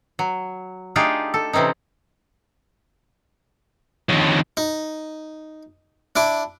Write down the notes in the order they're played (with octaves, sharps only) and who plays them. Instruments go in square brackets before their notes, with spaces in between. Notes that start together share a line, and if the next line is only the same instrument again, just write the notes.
[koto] F#3
A3 D4 D#4 F4 G4 G#4
A4
C3 E3 C4 C#4 D#4
[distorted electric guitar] F2 D3 [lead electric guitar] D#3 C#5
[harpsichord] D#4
D4 E4 D6